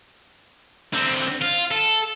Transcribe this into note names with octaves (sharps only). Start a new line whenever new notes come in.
D3 C4
F4
A4